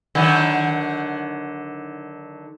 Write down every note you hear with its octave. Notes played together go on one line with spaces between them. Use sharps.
D3 D#3 F#3